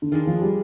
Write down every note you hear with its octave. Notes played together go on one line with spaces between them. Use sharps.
D3
D#3 G#3 D4 F4 G#4
F3
G3